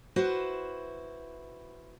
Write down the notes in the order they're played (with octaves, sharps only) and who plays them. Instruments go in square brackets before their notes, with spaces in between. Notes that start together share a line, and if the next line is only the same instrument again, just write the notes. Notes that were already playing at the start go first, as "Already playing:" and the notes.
[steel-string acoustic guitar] E4 F#4 B4 C5